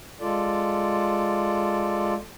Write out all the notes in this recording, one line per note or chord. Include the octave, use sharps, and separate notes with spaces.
G#3 F4 A4 D5